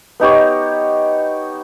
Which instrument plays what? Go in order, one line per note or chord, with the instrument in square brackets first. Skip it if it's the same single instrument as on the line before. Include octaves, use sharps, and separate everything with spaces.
[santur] B3 D#4 G4 C#5